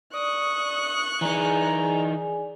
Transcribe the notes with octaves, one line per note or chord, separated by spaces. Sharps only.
D5 C#6 D#6 F#6
E3 D#4 G#4 D5 G#5 A#5